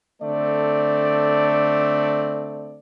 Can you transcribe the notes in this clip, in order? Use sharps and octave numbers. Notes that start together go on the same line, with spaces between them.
D3 A3 C4 A4 D5